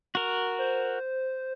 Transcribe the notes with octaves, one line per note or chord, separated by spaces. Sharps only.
F#4 A#4
C5